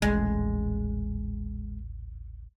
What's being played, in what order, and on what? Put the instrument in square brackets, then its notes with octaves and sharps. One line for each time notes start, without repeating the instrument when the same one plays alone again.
[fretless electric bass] D#1 A1 A2 [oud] G#3